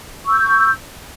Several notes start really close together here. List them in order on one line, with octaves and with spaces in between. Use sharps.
C#6 E6 G6